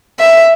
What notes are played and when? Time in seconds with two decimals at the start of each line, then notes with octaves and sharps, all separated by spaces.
0.19 E5